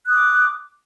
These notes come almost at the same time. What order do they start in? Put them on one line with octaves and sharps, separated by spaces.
F#6 D#6 D6